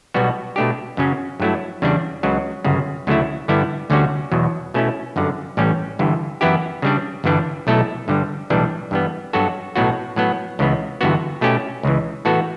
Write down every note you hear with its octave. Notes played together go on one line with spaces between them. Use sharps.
B1 B2 G3 B3 F#4
B2 A3 D4 G4
F#2 C#3 F#3 C#4
G2 F#3 A3 E4
E2 C#3 G3 D4
C#2 C#3 F#3
G1 F#2 C#3
D2 C#3 F#3 A3 E4
G2 D3 G3 B3 E4
D2 D3 G3 C#4 F#4
E2 B2 F#3
B2 A3 C#4 E4
G1 F#2 D3
A1 A2 G3 C#4
G1 G2 E3
F#2 E3 B3 E4 G4
C#3 G3 D4
G1 G2 E3 G3 D4
B1 B2 A3 E4 A4
G2 D3 G3
B1 A2 E3 G3 D4
G2 E3 G3 B3
G2 F#3 B3 F#4 A4
B1 A2 F#3 B3 F#4
A2 F#3 B3
C#2 C#3 E3 B3
G1 G2 E3 B3 F#4
B2 A3 C#4 G4
C#2 C#3 E3
A2 E3 B3 F#4 A4